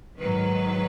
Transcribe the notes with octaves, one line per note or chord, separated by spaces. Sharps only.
G#2 D#3 F#3 B4